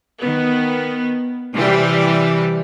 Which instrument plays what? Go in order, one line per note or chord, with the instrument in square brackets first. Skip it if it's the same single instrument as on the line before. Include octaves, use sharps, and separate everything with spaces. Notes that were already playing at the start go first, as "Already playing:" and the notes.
[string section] D#3 B3
C3 E3 G3 G4